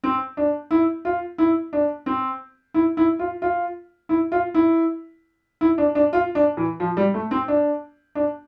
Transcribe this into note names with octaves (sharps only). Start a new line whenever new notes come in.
C4
D4
E4
F4
E4
D4
C4
E4
E4
F4
F4
E4
F4
E4
E4
D4
D4
F4
D4
E3
F3
G3
A3
C4
D4
D4